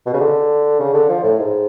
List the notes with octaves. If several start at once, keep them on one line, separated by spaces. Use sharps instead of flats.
B2
C#3
D3
C#3
D3
F3
A2
G#2